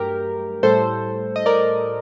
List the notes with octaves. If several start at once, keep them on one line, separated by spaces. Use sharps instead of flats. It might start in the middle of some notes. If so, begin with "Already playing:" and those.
Already playing: G2 F#3 A3 G4 A#4
A2 G3 A4 C5
D#5
A#4 D5